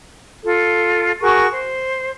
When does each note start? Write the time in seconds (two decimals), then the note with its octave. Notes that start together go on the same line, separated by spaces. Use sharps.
0.44 F4 A4
1.21 F#4 G#4 A#4 C#6
1.53 C5